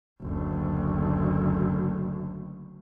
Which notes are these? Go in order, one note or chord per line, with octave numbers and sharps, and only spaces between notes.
F#1 D2